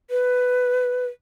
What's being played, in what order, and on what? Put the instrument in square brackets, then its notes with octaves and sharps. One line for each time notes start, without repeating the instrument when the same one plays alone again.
[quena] B4